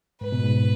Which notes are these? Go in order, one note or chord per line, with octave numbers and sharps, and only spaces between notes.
G#2 B4
B2
G#2